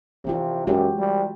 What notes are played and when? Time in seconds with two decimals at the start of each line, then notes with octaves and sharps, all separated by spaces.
0.25 C3 E3 C4 F4
0.67 F#2 G#3 F#4 G4
0.99 G3